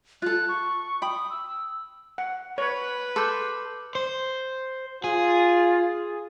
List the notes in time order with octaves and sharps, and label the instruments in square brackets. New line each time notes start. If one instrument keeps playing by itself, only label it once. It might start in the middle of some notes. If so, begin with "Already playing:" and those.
[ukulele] F4 A4 [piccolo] F#6
[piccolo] C#6
[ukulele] G5 B5 [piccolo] D#6
[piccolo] E6
[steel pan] F#5
[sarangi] B4 [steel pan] C#5
[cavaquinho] A4 [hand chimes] C6 D6 G6
[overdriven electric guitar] C5
[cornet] F4 [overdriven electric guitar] G#4